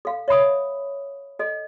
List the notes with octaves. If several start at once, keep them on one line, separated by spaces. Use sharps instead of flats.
A4 F5
C#5 E5 B5 D#6
A4 D#5